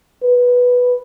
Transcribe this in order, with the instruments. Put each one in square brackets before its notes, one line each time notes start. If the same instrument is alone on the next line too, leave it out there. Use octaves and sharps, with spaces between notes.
[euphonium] B4